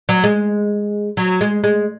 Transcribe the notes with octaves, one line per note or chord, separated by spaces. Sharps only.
F#3
G#3
F#3
G#3
G#3